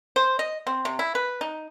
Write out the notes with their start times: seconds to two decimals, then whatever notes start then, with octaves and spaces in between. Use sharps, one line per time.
0.16 C5
0.39 D#5
0.67 C4
0.85 C3
0.99 E4
1.15 B4
1.41 D#4